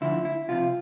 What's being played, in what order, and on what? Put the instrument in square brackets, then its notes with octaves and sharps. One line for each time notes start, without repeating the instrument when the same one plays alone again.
[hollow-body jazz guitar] D2 D3 F3 E4
E4
C2 C3 F3 F4